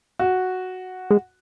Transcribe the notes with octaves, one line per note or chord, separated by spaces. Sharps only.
F#4
G#3